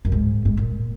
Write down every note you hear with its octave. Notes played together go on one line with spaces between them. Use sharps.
F#2
G#2
G#2
A#2